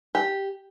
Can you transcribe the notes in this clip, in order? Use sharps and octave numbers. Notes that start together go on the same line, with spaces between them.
G4